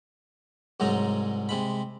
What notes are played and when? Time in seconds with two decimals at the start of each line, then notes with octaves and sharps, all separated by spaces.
0.80 C2 G#2 F#3 G#3 D#4 A#5
1.49 C3 G#3 B5